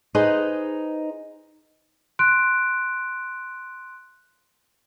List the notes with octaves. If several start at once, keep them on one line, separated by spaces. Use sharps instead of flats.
D#4 G#4 B4 C5
C6 F#6 D7